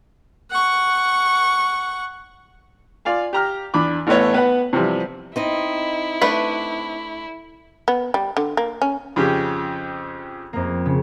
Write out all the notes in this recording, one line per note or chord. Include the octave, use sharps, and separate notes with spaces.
F#5 C#6
F4 D5 F5 G#5
G4 A#5 F6
E2 D4 B5 D6
A1 A2 A3 B3 C#5
B3 B4 F#5
C3 E3 F3 G3
C4 D#4 E4 D#5
A3 D4 B4
B3
G3
D3
A#3
C#4
F2 C#3 G4
F2 A#3
C#3